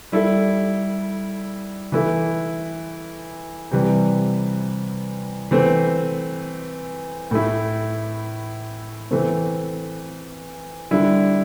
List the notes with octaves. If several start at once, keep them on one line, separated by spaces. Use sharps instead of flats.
G3 E4 A4
E3 A3 E4 A4
C3 E3 G3
E3 A3 C4
A2 A3 E4
E3 A3 C4
D3 G3 E4